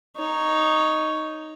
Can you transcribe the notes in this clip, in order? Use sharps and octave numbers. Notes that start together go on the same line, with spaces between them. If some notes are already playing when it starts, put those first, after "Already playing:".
D#4 C#5